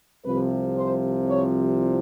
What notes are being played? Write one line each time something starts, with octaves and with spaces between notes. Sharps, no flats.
C2 C3 F3 B4
C5
C#5